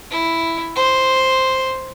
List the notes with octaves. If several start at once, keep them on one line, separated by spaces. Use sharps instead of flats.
E4
C5